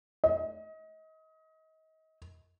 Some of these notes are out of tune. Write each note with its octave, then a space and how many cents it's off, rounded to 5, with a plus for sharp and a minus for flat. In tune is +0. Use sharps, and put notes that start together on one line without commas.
D#5 +30